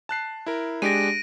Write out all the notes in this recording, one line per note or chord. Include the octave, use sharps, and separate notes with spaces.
A5 F#6 C7
E4 A#4
G#3 D4 G4 A#6 D7 D#7